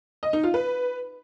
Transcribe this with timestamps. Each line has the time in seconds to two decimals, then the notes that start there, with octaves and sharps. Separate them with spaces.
0.23 D#5
0.33 D#4
0.44 F4
0.54 B4